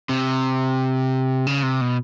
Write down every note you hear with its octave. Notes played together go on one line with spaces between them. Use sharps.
C3
C#3
C3
B2